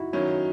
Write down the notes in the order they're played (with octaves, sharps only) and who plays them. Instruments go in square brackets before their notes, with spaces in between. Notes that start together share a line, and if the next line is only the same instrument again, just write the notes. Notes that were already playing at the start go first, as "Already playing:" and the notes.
Already playing: [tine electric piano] D#4 E4 F#4
[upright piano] D#3 F#3 C#4 [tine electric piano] E4